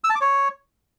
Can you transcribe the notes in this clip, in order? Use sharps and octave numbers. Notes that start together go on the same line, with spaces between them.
E6
A5
D6
C#5